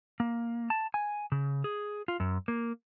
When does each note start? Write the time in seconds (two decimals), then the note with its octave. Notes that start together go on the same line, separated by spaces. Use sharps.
0.20 A#3
0.70 A5
0.94 G#5
1.32 C#3
1.64 G#4
2.08 F4
2.20 F#2
2.48 A#3